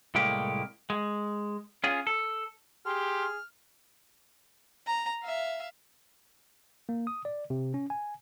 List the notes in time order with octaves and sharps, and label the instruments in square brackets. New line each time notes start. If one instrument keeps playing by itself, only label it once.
[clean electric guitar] C2 A2 G#3 A#3 G4
G#3
C#4 F4 G#4
A4
[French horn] G4 [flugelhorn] G#4 [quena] C6 [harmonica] F6
[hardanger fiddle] A#5
E5 F5
[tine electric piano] A#3
D#6
D5
C3
C#4
G#5